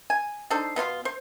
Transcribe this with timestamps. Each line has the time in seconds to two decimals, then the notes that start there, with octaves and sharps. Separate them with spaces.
0.10 G#5
0.50 D4 D#4 A4 C5
0.76 B2 B3 F4 C6
1.05 C5